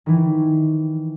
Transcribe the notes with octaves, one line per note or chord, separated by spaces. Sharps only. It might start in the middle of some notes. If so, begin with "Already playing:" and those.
D#3 E3